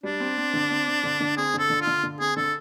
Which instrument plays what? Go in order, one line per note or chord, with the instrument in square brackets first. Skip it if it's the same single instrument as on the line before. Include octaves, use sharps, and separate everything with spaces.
[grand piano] G3 [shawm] D4
[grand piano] C4
C4
D3
C4
C4
D3
D3
[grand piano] C4 [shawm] G#4
[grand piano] D3 [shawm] A4
[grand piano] D3
[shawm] F4
[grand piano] D3
D3
[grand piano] C4 [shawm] G#4
[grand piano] D3 [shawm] A4